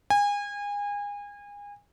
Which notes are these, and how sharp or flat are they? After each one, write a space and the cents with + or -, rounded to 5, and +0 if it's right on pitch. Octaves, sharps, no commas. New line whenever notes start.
G#5 -30